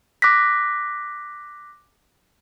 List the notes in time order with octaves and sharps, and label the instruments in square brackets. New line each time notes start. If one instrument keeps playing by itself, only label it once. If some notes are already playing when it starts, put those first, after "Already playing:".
[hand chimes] D6 F#6 A#6 B6